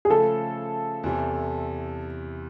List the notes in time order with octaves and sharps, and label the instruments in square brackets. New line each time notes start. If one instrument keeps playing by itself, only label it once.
[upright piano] G#4
[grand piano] C#3 F3 A3 [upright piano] A4
[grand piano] E2 C3 E3